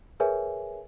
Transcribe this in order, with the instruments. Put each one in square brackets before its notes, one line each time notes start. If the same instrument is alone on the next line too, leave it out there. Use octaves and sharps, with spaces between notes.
[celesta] G#4 A#4 B4 C#5 E5 G#5